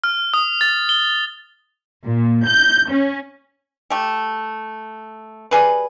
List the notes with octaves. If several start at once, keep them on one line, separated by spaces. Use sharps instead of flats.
F6
D#6
A6
G7
A#2
G6
C#4
A3 G4
G3 G#4 B4